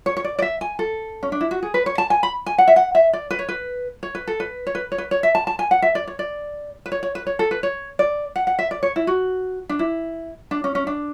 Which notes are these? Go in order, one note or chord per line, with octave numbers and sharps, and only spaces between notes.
C#5
C#5
D5
D5
E5
G#5
A4
C#4
D4
E4
F#4
G#4
B4
C#5
A5
G#5
B5
G#5
F#5
E5
F#5
E5
D5
B4
C#5
B4
C#5
B4
A4
B4
C#5
B4
C#5
B4
C#5
E5
A5
A5
G#5
F#5
E5
D5
C#5
D5
B4
C#5
C#5
B4
C#5
A4
B4
C#5
D5
F#5
F#5
E5
D5
C#5
E4
F#4
D4
E4
D4
C#4
C#4
D4